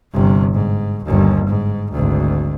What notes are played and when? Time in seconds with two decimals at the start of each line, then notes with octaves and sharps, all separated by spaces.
0.13 G1 C3
0.54 G#2
1.04 G1 D#2
1.47 G#2
1.91 G#1 D2